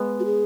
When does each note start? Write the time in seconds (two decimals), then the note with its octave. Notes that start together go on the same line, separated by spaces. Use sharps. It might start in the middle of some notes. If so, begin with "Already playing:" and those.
Already playing: G#3 B3
0.19 F#4
0.24 G#4